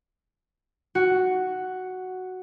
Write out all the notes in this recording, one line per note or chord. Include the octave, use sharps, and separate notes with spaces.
F#4